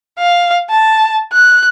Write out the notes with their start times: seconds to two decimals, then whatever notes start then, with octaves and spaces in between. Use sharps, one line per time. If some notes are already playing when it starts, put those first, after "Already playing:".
0.19 F5
0.70 A5
1.33 F#6